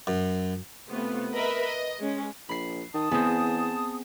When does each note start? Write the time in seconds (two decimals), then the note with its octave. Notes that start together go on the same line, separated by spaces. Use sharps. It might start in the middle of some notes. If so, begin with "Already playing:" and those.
0.07 F#2
0.88 C3 A3 B3 F4
1.33 A#4 B4 D#5 E5 B5
1.64 D#5
1.99 G#3 C#4
2.49 A#1 B5 C7
2.94 D#3 A5 D#6
3.11 E2 B3 C4 G#4